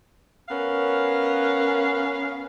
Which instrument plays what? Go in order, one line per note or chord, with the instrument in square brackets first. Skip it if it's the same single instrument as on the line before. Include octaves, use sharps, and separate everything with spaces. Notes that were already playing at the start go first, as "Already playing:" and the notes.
[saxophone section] B3 C#4 A#4 F5